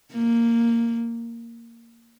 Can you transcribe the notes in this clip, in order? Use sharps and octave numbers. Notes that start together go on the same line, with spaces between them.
A#3